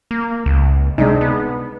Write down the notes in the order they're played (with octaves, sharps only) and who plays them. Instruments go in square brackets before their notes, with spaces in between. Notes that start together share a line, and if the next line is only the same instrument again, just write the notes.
[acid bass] A#3
C#2
[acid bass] C3 [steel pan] G#3 D4 D#4
[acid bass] B3